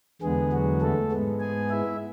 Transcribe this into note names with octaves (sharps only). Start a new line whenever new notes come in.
E2 D3 G#3 B3 G#4
F#3 F#4
A3 A4
G#2 G#3 B3
G#4 G#5
E4 E5